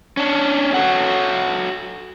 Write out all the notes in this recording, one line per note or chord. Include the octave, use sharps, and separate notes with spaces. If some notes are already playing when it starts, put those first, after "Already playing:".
C#4 D4
F#4 A4 C#5 F#5